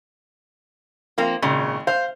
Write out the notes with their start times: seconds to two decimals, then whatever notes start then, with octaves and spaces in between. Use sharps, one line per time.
1.18 F3 A#3 C4
1.42 G#1 A#2 C#3
1.87 C5 F5